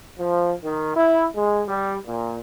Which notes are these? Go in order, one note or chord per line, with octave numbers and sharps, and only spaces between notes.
F3
D#3
E4
G#3
G3
A#2